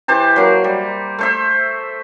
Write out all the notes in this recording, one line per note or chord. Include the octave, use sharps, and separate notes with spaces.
E3 G4 C5 A5
F#3 A#3
G3
A3 C5 E5